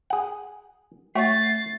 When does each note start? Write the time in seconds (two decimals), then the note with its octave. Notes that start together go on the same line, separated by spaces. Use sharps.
0.10 G#4 F#5
1.15 A3 F#4 C#5 F#5 A6 C7